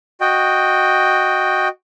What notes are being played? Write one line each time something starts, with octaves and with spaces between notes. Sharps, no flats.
F#4 D#5 G5